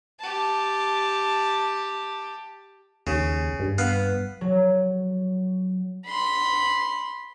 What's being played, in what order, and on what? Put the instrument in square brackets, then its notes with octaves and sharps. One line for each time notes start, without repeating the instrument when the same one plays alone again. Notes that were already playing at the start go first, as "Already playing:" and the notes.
[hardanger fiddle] G4 A5
[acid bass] D#2 [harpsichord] C#3
[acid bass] G2
[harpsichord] B3 F5 B5
[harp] F#3
[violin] B5 C6